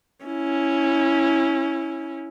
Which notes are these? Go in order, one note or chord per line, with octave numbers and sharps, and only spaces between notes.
C#4 E4